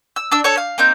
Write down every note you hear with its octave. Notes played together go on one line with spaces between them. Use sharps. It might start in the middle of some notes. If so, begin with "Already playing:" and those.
E6
D4 E6
A4 C#5
F5
A#3 C4 D#4 G6